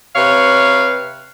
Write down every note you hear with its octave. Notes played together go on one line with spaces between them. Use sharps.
C3 B4 C#5 F5